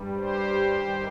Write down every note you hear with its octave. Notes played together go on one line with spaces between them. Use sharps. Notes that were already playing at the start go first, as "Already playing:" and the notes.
Already playing: G2 G3
G4 C5
G2 D#3 G3